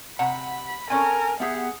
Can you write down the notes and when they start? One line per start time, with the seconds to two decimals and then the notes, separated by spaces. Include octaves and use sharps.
0.19 C3 F#5 A#5 B5
0.90 C4 C#4 A4 A#4 G#5
1.40 B3 G4 G#4 E5 F#5